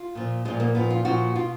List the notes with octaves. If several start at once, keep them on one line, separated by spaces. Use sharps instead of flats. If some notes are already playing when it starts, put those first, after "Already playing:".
Already playing: F4
A#2 F3
A#2 F3 G#3
A#3
A#2 F3 B3
F4
A#2 F3 F#4
B2 F4